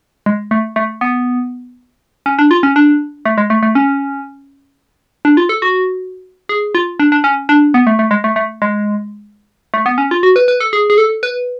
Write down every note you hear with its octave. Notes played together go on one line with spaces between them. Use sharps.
G#3
A3
A3
B3
C#4
D4
F4
C#4
D4
A3
G#3
A3
A3
C#4
D4
F4
A4
F#4
G#4
F4
D4
D4
C#4
D4
B3
A3
A3
G#3
A3
A3
G#3
A3
B3
C#4
F4
F#4
B4
B4
A4
G#4
G#4
A4
B4